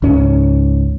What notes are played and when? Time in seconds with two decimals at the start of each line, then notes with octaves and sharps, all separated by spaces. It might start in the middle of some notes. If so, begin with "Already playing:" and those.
0.02 C#2 G#2 C#4